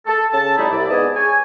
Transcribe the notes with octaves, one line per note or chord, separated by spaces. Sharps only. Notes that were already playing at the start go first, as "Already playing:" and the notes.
A4
C#3 C#4 A4 A5
A2 G3 A3 D#4 E4
C2 E4 D5
G#2 B3 D5 D#5 G#5 A5
G#4 C#5 G#5